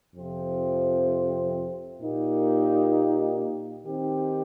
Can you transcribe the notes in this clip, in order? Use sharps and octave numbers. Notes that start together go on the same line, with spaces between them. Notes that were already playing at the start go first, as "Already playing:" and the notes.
F2 C3 F3 C4
A#2 A#3 D#4 G4
D#3 C4 D#4 G4